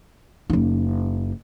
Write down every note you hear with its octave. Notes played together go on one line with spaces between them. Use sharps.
F#1 D#4